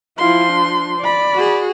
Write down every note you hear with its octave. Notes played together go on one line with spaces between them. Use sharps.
F3 E4 F4 C6
D4
D5 B5
F#4 G#4